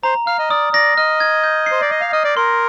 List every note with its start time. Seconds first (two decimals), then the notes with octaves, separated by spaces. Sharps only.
0.03 C5 A#5
0.27 F5 F6
0.39 D#5
0.50 D5 D#6
0.73 D5 A#6
0.97 D#5 F6
1.20 G#6
1.44 G6
1.66 C5 C7
1.82 D5
1.89 D#5 D6
2.01 F5
2.13 D#5 F6
2.24 D5
2.37 A#4 C6